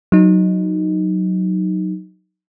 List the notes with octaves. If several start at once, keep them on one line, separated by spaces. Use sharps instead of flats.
F#3 D#4